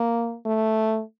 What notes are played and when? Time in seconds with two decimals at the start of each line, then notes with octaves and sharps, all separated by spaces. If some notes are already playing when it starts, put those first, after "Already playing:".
Already playing: A#3
0.46 A3